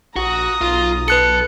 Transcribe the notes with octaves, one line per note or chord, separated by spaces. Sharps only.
A#1 F#4 A#5 D#6
B1 F4
A4 B4 F#6 C#7